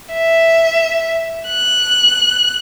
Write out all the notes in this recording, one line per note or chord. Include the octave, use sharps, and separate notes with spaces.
E5
F#6